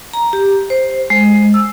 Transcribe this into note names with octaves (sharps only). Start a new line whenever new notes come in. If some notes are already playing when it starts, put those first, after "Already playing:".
A#5
G4
C5
G#3
E6